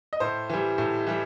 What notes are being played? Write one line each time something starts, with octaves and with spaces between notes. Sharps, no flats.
D#5
A2 C5
E3 G3
A2
E3 G3